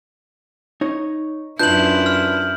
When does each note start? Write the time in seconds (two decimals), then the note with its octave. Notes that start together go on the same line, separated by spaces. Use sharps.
0.81 D#4 C#5
1.59 F#2 D4 E4 F4 B4 G6 F#7
2.06 F6